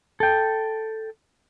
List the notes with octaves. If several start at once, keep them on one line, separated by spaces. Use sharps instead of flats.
A4 G5